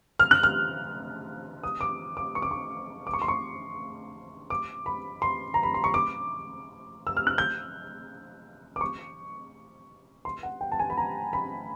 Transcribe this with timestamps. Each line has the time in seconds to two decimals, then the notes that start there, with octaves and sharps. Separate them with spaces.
0.19 F6
0.31 F#6
0.43 F6
1.63 D#6
1.81 D6
2.17 D6
2.35 C#6
2.42 D6
2.51 C#6
3.07 D6
3.14 C#6
3.22 C6
3.28 C#6
4.50 D6
4.86 B5
5.22 C6
5.54 A#5
5.63 B5
5.74 C6
5.84 C#6
5.94 D6
7.07 E6
7.17 F6
7.27 F#6
7.38 G6
8.76 D6
8.81 C#6
10.25 C6
10.43 F#5
10.61 G5
10.72 A5
10.79 G#5
10.90 B5
10.97 A#5
11.33 B5